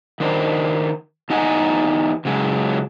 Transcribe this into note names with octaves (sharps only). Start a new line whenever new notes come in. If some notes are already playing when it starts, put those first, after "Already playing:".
D#3 D4 C5
E2 D#4 D#5 F#5 G#5
C#3 F#3 G#3